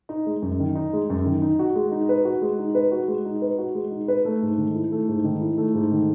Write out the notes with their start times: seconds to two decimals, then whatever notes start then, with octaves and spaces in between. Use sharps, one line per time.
0.09 D#4
0.26 G#3
0.42 F#2
0.60 D#3
0.75 D#4
0.93 G#3
1.10 F#2
1.26 D#3
1.42 D#4
1.59 F#4
1.76 G#3
1.92 D#4
2.09 B4
2.25 F#4
2.42 G#3
2.59 D#4
2.75 B4
2.92 F#4
3.08 G#3
3.25 D#4
3.42 B4
3.58 F#4
3.75 G#3
3.91 D#4
4.08 B4
4.25 A3
4.42 G#2
4.58 D#3
4.75 E4
4.92 A3
5.08 G#2
5.24 D#3
5.41 E4
5.58 A3
5.74 G#2
5.92 D#3